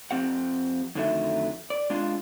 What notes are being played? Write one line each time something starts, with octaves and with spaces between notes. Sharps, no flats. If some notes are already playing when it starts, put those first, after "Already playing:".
F2 D#3 C4 G4 F#5
F2 D3 D#3 F#3 A3 E5
D5
G#3 D4 F4 G#4